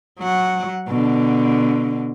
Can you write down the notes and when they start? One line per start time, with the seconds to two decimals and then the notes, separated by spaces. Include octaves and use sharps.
0.19 F#3 F#5
0.88 B2 D3